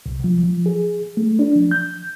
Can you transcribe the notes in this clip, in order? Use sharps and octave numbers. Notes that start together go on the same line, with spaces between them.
C2
F3
F3
G#4
A3
D4
F3
G6